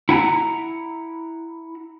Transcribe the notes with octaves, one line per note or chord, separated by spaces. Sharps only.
E4 F#5 G#5 A#5